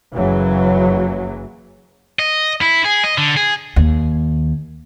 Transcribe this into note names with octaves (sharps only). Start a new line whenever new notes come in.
F#1 C#3 E3 F#3
D#5
E4
G#4
D#5
D3
G#4
D#2